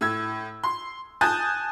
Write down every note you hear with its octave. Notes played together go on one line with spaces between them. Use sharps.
A2 E6 G#6
C6
G#5 A5 D#6 F#6 G6 A6